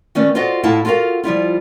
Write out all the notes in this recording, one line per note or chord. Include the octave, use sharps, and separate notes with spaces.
D#3 A3 C#4 B4 D5
F4 F#4 A4 C5 D#5 F#5
A2 E4 F4 A4 F5 A5
F4 F#4 A4 A#4 F5
F3 G3 E4 F4